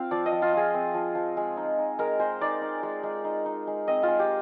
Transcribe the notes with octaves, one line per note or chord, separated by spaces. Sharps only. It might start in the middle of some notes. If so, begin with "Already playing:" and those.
Already playing: C4 F4 F5
F3 D5
D#5
F3
F4
F4 G#4
C4
F3
F3
G#3
D#4
D#4
G#3 A#4
G#3 C5
D#4 D5
D#4
G#3
G#3
D#4
D#4
G#3
C4 D#5
F4
G#3
G4